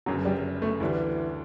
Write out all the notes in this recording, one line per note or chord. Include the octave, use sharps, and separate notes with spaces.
G1 F#2 C#3 F#3
G3
A3
D2 D3 E3 G3 D4